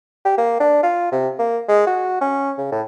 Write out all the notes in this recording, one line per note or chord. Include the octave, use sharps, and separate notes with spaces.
G4
A#3
D4
F4
C3
A#3
G#3
F#4
C#4
C#3
A2